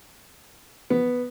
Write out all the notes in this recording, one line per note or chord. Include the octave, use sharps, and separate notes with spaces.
B3